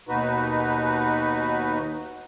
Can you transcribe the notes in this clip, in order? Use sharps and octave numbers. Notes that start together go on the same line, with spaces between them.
D#2 B2 D#4 F#4 B4